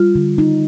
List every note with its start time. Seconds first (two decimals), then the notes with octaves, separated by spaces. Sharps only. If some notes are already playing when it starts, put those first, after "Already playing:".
Already playing: G3 F4
0.15 D3
0.38 D#4